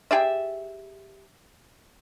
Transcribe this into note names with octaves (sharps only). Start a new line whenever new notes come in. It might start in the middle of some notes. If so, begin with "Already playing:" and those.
G4 G#4 D5 E5